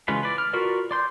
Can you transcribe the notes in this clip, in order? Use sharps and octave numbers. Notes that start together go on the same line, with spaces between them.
C#3 E3 G#3 F4 B4
B4 D5
F6
F4 F#4 A#4 B4 D5
D5 C6 G6